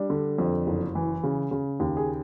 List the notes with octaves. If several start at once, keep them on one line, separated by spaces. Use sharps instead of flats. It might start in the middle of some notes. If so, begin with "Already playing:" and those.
Already playing: G3 D4
D3
F2
F#1
E3
C#3
C#3
D#2
G#4